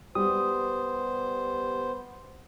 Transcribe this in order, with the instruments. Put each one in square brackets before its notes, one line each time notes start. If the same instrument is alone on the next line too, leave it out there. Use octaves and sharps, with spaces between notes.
[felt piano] G3 [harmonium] B3 C5 [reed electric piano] D#6